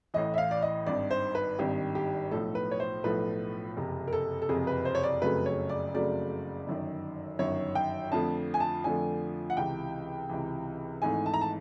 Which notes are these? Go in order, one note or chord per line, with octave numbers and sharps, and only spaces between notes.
A1 A2 E3 D#5
E5
F5
D5
D#5
G#1 G2 D#3 D5
C5
B4
G#1 G2 D#3 G4
G4
B1 A2 F3 A3 A4
B4
C#5
C5
B1 A2 F3 A3 B4
F#1 F2 C3
A#4
A4
A4
F#1 F2 C3 G#4
B4
C5
C#5
D5
F#1 F2 C#3 F#3 A3 B4
C#5
D5
F#1 F2 C#3 F#3 A3 D5
G1 F#2 D#3
G1 F#2 D#3 C#5
G5
F2 D3 F3 A3 A5
G#5
A5
F2 D3 F3 A3 G#5
F#5
C#2 C3 E3 G5
C#2 C3 E3
G#1 G#2 E3 A3 G#5
A5
A#5
A5